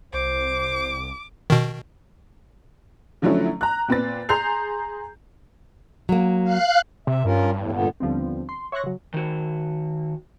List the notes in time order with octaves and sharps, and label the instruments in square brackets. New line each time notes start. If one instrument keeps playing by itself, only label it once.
[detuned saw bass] C2 [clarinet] C5 [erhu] D6
[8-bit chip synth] B2 D#3
[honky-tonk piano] D3 F3 F#3 A3 C#4 E4
A#5 F#6
A#2 C4 B4 A6
G#4 A#5 C6 G6 C7 F7
[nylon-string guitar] F#3 A#3
[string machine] F5 F#6
[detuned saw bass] C3 [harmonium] E5
[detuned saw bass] G2 [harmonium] C#4 F4 A#4
[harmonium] E2 A2
A#2 D3 B3
[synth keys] D#2 D3 F3 G3 B3 C4
C6
C#5 E5 C6 C#6 F#6 A#6
C#3 F#3
[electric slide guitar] D#3 F#4